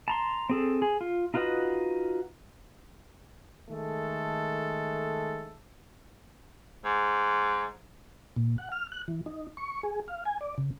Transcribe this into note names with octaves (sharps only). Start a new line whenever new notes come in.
A5 A#5 C6
C4 G#4 A4
G#4
F4
D#4 F4 F#4 B4 D#5
D#3 G#3 A3 A4
G#2
A#2
F#5
F6
F#6
E3
D#4
C#6
G#4
F5
G#5
D5
C#3